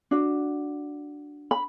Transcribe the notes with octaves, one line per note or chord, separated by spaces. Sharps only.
D4 F#4
B5